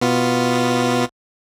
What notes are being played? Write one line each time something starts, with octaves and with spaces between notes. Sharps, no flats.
B2 B3 F4